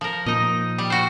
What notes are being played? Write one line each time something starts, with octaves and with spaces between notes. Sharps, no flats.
F3 A#4
A#2 F3 A#3 D#4 D#5
G3
F#4 C5